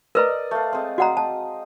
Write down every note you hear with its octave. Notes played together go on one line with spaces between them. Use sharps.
A#4 B4 D5 D#5 A#5
A3 F5
G#3 C4
F#4 D5 D#5 F#5 A#5
D#5 A5